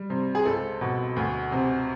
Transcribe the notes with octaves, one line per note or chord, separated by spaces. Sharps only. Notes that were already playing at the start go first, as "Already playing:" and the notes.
Already playing: G3
C3
G#4
C#2 A4
B2
D2
C3